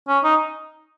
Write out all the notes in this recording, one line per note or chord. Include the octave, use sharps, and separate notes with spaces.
C#4
D#4